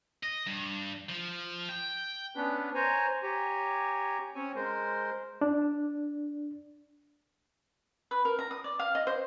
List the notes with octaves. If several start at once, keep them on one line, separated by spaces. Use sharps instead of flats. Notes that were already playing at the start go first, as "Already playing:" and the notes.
D#5
G2
F3
G5
B3 C#4 D4 B4
C5 C#5 G#5 A#5
G4 C#5 G#5 A#5
C4 C#4 C#5 G#5
G#3 A#4 C5
D4
B4
A#4
A#5
D#6
D5
F5
D#5
C5